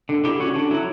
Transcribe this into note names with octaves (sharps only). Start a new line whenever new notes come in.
D3
D3 E4 G4
C#4 F#4
D3 F#4
F#3 E4